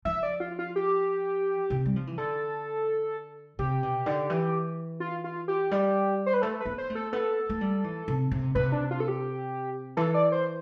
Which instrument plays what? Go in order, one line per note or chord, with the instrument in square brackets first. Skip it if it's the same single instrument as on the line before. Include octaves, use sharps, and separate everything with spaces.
[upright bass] F3 [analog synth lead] E5
[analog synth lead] D5
F4
F4
G4
[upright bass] C3
G3
F3
E3
[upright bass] D3 [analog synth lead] A4
[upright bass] C3 [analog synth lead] G4
[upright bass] B2
D3
E3
[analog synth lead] F4
F4
G4
[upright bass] G3
[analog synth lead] C5
B4
[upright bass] A3 [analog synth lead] A4
[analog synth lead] B4
[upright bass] B3
[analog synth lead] C5
[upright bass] A3
[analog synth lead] A4
[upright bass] B3 [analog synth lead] A4
[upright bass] A3
G3
E3
C3
C3
[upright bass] C3 [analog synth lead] B4
[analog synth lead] D4
F4
A4
G4
[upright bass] E3 [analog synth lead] A4
[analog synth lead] D5
C5